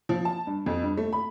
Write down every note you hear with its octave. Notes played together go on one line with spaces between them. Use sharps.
F3
A5
G2
F2
G2
A3
B5